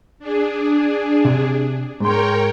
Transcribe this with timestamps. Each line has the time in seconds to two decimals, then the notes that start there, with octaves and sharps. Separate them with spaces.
0.19 D4 G#4
1.25 C3
2.00 G#2 A#4 C#5 G5 C6